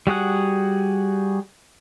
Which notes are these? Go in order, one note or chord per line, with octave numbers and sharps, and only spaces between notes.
G3 F#4 G#4 F#5